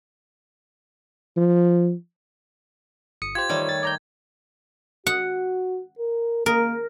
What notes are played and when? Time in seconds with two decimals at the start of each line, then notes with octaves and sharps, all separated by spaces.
1.37 F3
3.22 G1 D#6 C#7
3.35 F4 G4 C5 G#6
3.49 D#3 G3 A3 C#5
3.69 A6
3.83 D5 A#5 G6
5.07 F#4 F#5
5.99 A#4
6.46 A#3 A#4